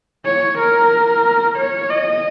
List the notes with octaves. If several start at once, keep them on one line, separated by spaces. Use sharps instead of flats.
C#5
A#4
C#5
D#5